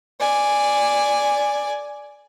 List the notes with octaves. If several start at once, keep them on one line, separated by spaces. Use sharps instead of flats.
D5 G#5